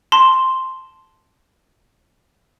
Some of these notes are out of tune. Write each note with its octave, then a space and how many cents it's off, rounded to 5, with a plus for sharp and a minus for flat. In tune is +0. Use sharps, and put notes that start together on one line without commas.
A5 +0 C6 +0